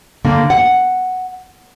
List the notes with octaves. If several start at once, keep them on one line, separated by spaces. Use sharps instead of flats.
D3 A#3
F#5